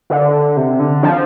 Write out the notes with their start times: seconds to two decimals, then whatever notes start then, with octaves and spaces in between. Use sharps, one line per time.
0.10 D3
0.57 C3
0.80 D3
1.03 F3